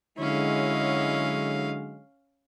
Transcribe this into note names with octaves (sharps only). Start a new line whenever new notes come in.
D3 F#3 G#3 C#4 E4 D#5 F5